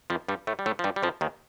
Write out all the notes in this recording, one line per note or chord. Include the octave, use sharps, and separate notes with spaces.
F2 F3
G2 G3
A2 A3
G3
A2 A3
F3
G2 G3
G3
F2 F3
D#2 D#3